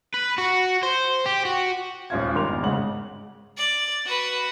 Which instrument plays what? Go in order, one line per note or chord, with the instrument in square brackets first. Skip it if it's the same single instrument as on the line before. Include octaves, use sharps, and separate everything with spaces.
[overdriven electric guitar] B4
F#4
C5
G4
F#4
[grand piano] D#1 G#1 C#4 F4 F5 G#6
D#3 G3 A#4 C6 D6 F7
E2
G#1 G#2 C#3 G#3 F#5 F#7
[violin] D5
F#4 B4